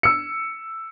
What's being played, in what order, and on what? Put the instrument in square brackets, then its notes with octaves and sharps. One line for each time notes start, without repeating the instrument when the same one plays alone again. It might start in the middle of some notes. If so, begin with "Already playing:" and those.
[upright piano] E6 C#7